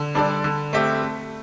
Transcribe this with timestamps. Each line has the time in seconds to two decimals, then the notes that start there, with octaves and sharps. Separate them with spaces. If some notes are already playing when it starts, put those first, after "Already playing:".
Already playing: D3
0.15 G3 D4 A4 D5
0.44 D3
0.73 A3 C4 G4 E5
1.02 A3